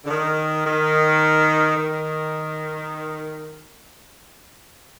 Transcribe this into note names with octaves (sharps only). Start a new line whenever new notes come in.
D3
D#3
D#3
D#3